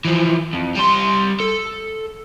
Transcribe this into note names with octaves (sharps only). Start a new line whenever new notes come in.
E3 F3
F2
G3 C6
A4